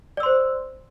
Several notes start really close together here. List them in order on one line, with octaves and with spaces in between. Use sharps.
D5 E6 C6 C5